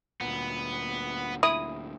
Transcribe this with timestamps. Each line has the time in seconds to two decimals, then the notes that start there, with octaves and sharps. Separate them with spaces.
0.21 D2 A#2 B3
1.43 E4 D#6